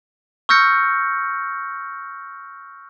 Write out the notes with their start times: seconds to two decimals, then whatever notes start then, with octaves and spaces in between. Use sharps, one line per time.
0.49 C#6 E6 F6 G6 A#6 C#7